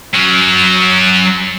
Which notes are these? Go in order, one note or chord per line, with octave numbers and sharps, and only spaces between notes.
F#3 C#4